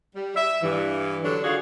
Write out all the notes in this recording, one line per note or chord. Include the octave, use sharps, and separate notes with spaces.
G3
E5
G2 E3
D3 F#3 G3 D4
D3 D#3 F4 F#4 G#4